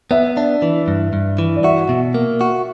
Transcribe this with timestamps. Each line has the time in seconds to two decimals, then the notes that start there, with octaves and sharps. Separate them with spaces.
0.11 B3 E5
0.37 D4
0.62 E3
0.88 G2
1.13 G2
1.39 E3
1.56 D5
1.64 F#4 E5
1.89 B2
2.14 A#3
2.41 F#4